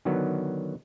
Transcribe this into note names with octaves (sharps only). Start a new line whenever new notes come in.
D3 D#3 F#3 B3